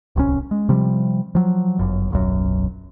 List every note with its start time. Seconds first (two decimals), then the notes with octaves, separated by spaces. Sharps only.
0.16 D1 C2 C#3 C#4
0.51 G#3
0.69 C3 F3 G3
1.35 F3 F#3
1.79 G1 F#2
2.11 D#1 B1 F#2